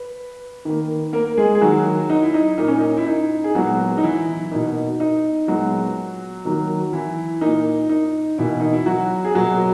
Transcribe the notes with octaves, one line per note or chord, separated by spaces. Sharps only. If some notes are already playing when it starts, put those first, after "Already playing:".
Already playing: B4
D#3 A#3
A#3 A#4
G#3 G#4
G#4
D#3 F#3 A#3 F#4
D#4
E4
D#4
A#2 A#3 D#4
C#4
D#4
E4
D#4
G#4
A#2 F#3 G#3 B3 F#4
D#4
E3 E4
B2 A#3 D#4
D#4
A#2 F#3 G#3 B3 F#4
D#3 F#3 A#3
E3 E4
A#2 A#3 D#4
D#4
B2 E3 A#3 E4
D#4
E4
F#3 F#4
G#4
B2 F#3 A#3 F#4